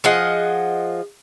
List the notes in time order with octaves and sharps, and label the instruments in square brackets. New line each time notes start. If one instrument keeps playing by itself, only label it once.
[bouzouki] F3 G#4 D#5 F#5